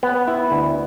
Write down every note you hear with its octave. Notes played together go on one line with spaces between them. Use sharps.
B3
E4
D2